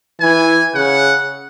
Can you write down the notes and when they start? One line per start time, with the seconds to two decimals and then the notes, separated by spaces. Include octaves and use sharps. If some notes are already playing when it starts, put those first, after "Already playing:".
0.20 E3 G#5
0.74 C#3 F#5